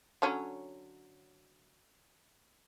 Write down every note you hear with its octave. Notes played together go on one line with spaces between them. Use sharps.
D3 F#3 C#4